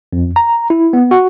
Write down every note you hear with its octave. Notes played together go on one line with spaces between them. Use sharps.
F2
A#5
E4
B3
F#4